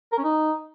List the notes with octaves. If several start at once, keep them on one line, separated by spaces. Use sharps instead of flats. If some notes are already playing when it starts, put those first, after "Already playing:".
A#4
C#4
D#4